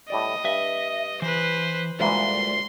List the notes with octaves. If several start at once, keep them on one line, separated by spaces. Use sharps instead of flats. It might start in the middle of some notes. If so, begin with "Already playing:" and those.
A2 G3 D5 D#5
G2 E5
E3 B4 C5
D2 A#2 E3 G3 G#3 C6